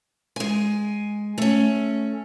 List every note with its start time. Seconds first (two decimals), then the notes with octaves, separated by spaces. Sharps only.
0.36 G#3 G#5
1.38 A3 C#4